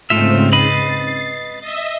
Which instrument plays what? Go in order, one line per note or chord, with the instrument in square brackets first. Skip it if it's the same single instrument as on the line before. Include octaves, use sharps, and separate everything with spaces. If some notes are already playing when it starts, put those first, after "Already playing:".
[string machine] G#2 C#3 C4 [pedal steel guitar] A3 F4 E5
[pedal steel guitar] B4 D#5 B5 [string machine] A6 C7
[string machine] D#5 E5